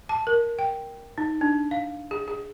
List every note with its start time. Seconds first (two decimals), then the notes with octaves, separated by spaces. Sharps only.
0.09 A5
0.27 A#4
0.59 G5
1.18 D#4
1.41 D4
1.71 F5
2.11 G#4
2.28 G#4